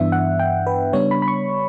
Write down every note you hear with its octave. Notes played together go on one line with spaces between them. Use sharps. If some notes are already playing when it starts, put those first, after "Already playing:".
Already playing: G2 E3 B3 D4 E5
F#5
G5
B4
C#3 G3 B3 D4 C#5
B5
B5
C#6